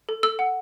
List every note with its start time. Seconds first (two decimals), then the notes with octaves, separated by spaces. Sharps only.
0.09 A4
0.23 A4 E6
0.39 F#5